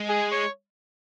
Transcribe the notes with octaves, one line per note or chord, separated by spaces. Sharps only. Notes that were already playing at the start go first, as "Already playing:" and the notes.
Already playing: G#3
G#4
C#5